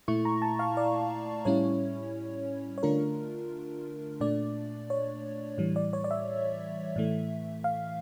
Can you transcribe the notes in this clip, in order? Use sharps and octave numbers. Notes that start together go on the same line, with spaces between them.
A#2 A3 E4 C#6
A#5
A5
F5
D5
A2 G3 C#4 E4 C#5
C#5
D3 A3 D4 F4 A#4
A#2 A3 D4 D5
C#5
A2 E3 G3
D5
C#5
D5
E5
A2 E3 A3
F5